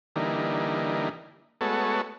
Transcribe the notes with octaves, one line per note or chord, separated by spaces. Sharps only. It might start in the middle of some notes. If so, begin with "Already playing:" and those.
D3 E3 G3 A#3 D#4
G#3 A3 B3 F#4 A4 C#5